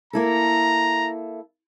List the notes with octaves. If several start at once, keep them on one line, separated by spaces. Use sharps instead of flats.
A#3 E4 A4 A#5